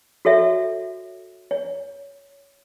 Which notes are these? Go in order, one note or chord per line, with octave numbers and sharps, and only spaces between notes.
F#4 A4 C#5 E5
C#5